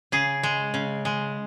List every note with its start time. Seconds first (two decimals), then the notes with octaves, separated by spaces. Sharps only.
0.12 C#3 G#4
0.43 G#3
0.74 C#3
1.05 G#3